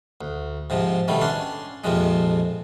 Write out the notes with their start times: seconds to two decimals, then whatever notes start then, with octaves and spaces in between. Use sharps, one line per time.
0.21 D2
0.70 G#2 C3 F3
1.08 B2 D#3 G3 A3
1.21 C#4 D4 C6
1.84 A#1 F2 C3 F3 G#3